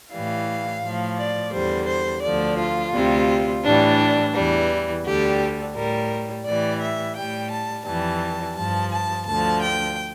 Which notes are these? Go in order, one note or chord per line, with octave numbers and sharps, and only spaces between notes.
A2 E3 G3 F5
A2 F3
D5
E2 D3 G3 C5
C5
D2 D3 F3 D5
F4
D2 C3 G3
A2 E3 G3 D4
E2 E3 G3
D2 D3 G3 G4
A2 G3 A#4
A2 E3 G3 D5
E5
A2 G3 G5
A5
F2 E3 G3 A5
G2 F3 A5
A5
D2 D3 F3 A5
G5